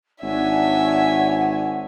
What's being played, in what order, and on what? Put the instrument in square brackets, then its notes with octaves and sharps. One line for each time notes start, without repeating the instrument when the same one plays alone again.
[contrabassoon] G#1 [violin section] D4 C#5 G#5 [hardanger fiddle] E5 [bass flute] F#5